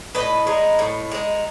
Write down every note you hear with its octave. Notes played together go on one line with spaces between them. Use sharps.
A2 B4 D#5
G#3 D#4
A2
G#3 D#4